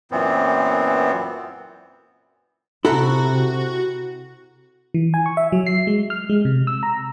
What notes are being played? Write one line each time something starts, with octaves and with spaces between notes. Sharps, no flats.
F#2 A#2 E3 B3 C4
C3 E4 F#4 A4 A#5
E3
G#5
C#6
E5
F#3
C7
G#3
F6
G#3
C3
E6
A#5